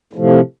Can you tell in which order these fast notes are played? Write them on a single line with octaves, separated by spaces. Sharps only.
A2 F3 C3